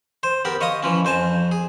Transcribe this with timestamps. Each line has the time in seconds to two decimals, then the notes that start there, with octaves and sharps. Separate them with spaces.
0.23 C5
0.45 B3 G4 A#4
0.61 C#5 D#5 F5 C6 D#6
0.83 E3 F3 C#4
1.05 F2 C5 G#5 A5
1.51 G#4